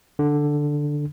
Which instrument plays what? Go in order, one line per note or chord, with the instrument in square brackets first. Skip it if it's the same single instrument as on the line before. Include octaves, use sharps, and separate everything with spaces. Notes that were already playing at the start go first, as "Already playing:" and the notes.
[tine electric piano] D3